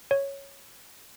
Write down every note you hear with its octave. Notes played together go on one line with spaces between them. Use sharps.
C#5